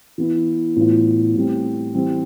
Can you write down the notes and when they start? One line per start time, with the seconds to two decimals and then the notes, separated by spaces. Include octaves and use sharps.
0.18 E3 B3 E4
0.76 A2 E3 B3 F4
1.35 A2 G3 C4
1.95 E3 G3 C4